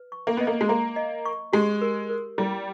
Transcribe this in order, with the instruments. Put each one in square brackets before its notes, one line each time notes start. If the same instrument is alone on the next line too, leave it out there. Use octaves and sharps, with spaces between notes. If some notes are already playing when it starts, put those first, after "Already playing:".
Already playing: [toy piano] B4
C#6
[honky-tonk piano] A#3
[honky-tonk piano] B3 [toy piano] D#5
[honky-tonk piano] A#3
G#3
[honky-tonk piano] A#3 [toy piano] A#5
[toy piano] D#5
C#6
[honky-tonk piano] G#3 [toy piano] G4
[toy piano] A#4
A#4
[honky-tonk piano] G3 [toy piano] E4